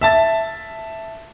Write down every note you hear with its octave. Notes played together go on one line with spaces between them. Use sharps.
E5 A5 A6